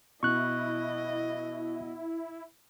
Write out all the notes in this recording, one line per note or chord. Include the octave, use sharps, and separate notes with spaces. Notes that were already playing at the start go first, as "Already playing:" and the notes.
B2 E4 D#5 C#6 F#6